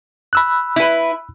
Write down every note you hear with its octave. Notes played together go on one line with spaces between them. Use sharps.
B5 E6 F#6
E4 B4